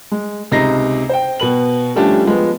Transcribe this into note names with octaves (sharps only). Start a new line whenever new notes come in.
G#3
C#2 C3 D#4 A#5 A#6 C7
C5 G5
B2 B4 F#7
F3 G3 A3 C#4 D4 G4
F3 G#3 B3